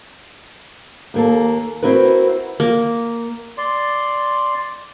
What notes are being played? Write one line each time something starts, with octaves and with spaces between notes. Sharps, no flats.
D#2 A#3 A4
C4 E4 F#4 A#4 B4
A#3
D5 C6